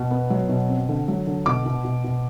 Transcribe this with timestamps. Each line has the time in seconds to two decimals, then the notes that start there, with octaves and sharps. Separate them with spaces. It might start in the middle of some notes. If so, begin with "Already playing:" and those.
Already playing: B2
0.11 B3
0.30 F#3
0.49 B2
0.69 C4
0.89 D3
1.08 F#3
1.27 D3
1.46 B2 D6
1.66 B2
1.85 B2
2.04 B2